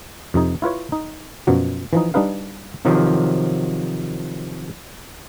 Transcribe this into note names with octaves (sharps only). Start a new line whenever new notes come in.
F2 C3 D#4
E4 F4 B4 C#5
D#4
F#2 B2 F3 F#3
E3 F3 D#4
G3 D4 D#4 B4 F5
C3 D#3 F3 F#3